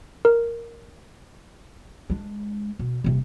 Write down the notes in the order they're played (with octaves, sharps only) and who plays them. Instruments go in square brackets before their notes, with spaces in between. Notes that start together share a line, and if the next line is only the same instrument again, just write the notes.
[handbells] A#4
[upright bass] G#3 D4
B2
D#1 C3